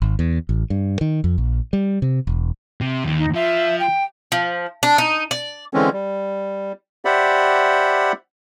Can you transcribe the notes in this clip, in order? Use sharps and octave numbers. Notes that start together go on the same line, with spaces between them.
G#1
E2
A1
G2
D#3
F2
A#1
G3
C3
E1
C3
D#2
D#4
F3 E5
G5
F3
D4
D#4
D5
D3 E3 G#3 C4 C#4
G3
G4 C5 D5 E5 F#5 B5